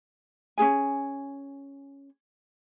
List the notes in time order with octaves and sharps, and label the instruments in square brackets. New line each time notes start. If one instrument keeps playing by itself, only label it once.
[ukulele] C#4 D4 G#4 G#5